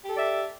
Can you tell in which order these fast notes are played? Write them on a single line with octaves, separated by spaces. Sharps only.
G4 A4 D5 E5